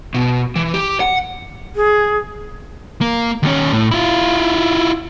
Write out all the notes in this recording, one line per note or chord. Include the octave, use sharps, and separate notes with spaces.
B2
E3
G4
F#5
G#4
A#3
D#2 C#4
A2
E4 F4